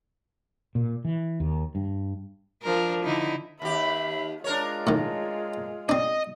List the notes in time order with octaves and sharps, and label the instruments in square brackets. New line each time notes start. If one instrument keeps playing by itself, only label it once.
[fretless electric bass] A#2
E3
D#2
G2
[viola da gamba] F3 D4 A#4
D3 D#4 E4
[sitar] D#2 G4 [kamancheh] E5 B5
[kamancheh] G#3 F4 [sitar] D4 A#4 C#5
[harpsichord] A2 D#3
[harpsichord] C4 D4 [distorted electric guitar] D#5